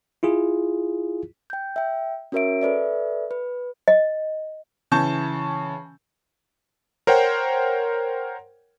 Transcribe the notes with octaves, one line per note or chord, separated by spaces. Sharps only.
E4 F4 G#4
G5 G6
E5 G5
C#4 F#4 A#4 C#5 E5 D7
A4 B4 D5 E5
B4
D#5
C#3 E3 A5 C#6 G6
A#4 C5 C#5 F#5 G5